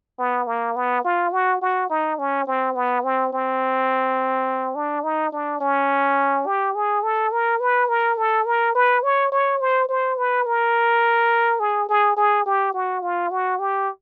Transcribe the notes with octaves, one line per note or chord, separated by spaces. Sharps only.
B3
A#3
B3
F4
F#4
F#4
D#4
C#4
C4
B3
C4
C4
D4
D#4
D4
C#4
G4
G#4
A4
A#4
B4
A#4
A4
A#4
B4
C#5
C#5
C5
C5
B4
A#4
G#4
G#4
G#4
G4
F#4
F4
F#4
G4